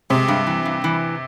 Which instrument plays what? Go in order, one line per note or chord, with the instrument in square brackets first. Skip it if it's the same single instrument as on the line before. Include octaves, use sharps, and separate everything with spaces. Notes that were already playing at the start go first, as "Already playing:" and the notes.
[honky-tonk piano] C3 [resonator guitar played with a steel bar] G#3
[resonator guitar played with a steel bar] G2
E3
G2
E3